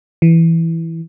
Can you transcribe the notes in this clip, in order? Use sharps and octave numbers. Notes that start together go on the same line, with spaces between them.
E3